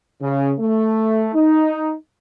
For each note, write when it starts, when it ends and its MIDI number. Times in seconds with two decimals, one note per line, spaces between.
0.21 0.52 49
0.60 1.30 57
1.35 1.94 63